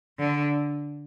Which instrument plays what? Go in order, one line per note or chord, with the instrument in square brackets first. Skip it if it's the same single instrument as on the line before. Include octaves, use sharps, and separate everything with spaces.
[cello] D3